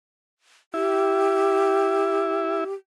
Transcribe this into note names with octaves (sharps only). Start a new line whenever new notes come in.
E4 G4